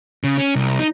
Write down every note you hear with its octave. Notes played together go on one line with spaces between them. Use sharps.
C#3
C#4
C2
D#4